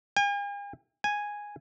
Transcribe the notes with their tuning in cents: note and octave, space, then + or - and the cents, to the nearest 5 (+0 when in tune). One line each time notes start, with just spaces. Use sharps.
G#5 -45
G#5 -5